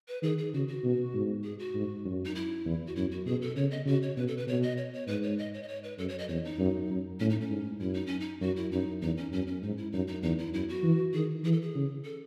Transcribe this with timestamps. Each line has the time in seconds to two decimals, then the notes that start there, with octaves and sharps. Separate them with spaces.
0.08 B4
0.22 D#3 G#4
0.38 G#4
0.53 C#3 F#4
0.68 F#4
0.84 B2
1.14 G#2
1.44 G#4
1.59 F#4
1.75 G#2
2.05 F#2
2.25 D#4
2.35 E4
2.65 E2
2.87 F#4
2.95 F#2 E4
3.11 F#4
3.26 B2 G#4
3.42 A4
3.56 C#3 C#5
3.71 D#5
3.86 C#3 F#4
4.02 C#5
4.16 B2 B4
4.27 A4
4.37 B4
4.47 B2 C#5
4.63 D#5
4.77 C#5
4.93 C#5
5.07 G#2 B4
5.23 C#5
5.38 D#5
5.54 C#5
5.63 D#5
5.68 C#5
5.84 B4
5.98 F#2 A4
6.09 C#5
6.18 D#5
6.28 E2 C#5
6.45 D#4
6.59 F#2
6.90 F#2
7.20 A2 C#4
7.30 D#4
7.41 C#4
7.50 G#2
7.80 F#2 E4
7.94 D#4
8.06 C#4
8.20 D#4
8.41 F#2 F#4
8.56 E4
8.72 F#2 D#4
9.01 E2 D#4
9.17 C#4
9.32 F#2 C#4
9.47 C#4
9.63 G#2 D#4
9.77 E4
9.92 F#2 D#4
10.07 D#4
10.22 E2 D#4
10.38 E4
10.53 F#2 E4
10.69 F#4
10.83 E3
11.14 D#3 G#4
11.44 E3 G#4
11.52 A4
11.61 G#4
11.75 C#3
12.04 A4